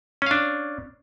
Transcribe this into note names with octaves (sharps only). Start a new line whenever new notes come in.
C#4 D4 F5